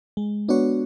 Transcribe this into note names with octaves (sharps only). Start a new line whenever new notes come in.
G#3
B3 D4 F#4 C#5